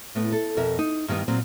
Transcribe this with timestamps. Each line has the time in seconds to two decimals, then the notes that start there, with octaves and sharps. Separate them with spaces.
0.15 A2 A3 B3
0.32 A4
0.57 F2 B2 A#4 E5
0.79 D#4
1.08 G2 D#3 G3 B3
1.28 A#2 F#3 B3 C4